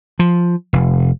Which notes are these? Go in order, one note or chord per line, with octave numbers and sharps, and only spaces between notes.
F3
F1